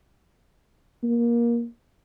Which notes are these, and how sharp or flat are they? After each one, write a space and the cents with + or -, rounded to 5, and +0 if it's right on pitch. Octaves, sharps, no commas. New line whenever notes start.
A#3 +20